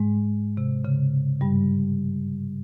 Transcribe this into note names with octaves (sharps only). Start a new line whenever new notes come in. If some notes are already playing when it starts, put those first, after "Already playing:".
Already playing: G#2 G#3
C3
C#3
G2 G3